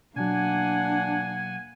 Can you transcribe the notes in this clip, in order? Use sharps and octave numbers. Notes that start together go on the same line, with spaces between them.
B2 F#3 A#3 D4 F#5 G#5